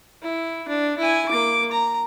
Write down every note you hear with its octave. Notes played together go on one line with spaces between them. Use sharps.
E4
D4
E4 G#5
A#3 D6
A#5